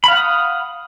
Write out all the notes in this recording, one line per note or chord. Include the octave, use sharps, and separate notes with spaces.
F5 F#5 B5 D#6